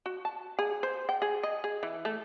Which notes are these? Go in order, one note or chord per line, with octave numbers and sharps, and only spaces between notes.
F#4
A5
G#4
C5
G5
G#4
D#5
G#4
E3
A3